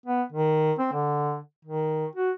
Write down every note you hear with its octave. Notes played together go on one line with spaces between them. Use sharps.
B3
D#3
C4
D3
D#3
F#4